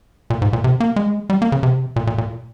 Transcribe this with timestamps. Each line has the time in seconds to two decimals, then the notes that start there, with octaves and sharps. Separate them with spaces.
0.30 A#2
0.42 G#2
0.53 A#2
0.64 C3
0.80 A#3
0.96 G#3
1.30 G3
1.42 A#3
1.52 C#3
1.63 C3
1.96 A#2
2.07 A#2
2.18 A#2